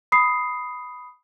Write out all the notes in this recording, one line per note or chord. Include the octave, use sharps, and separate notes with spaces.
B5 D#6 C7